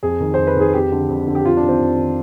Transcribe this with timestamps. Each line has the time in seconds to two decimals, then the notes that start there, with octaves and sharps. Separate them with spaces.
0.03 F2 G#4
0.20 D#3
0.34 F2 C5
0.47 B4
0.56 D#3 G#4
0.73 F2 G4
0.92 D3
1.09 F2
1.27 D3
1.35 G4
1.45 F2 F4
1.57 D4
1.63 D#3
1.69 C4
1.81 F2
1.98 D#3